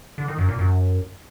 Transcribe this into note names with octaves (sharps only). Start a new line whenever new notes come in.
D3
D#3
F#2
A#2
F#2